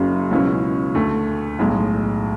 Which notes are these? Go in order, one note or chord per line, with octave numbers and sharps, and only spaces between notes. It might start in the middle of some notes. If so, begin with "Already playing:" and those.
Already playing: F#1 F#2 C#3 F#3
C#2 B2 F#3 C#4 E4
D2 D3 A3
B1 A2 G#3